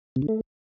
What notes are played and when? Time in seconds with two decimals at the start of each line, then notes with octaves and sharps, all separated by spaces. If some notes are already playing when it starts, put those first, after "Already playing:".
0.16 C3
0.22 D3
0.28 A3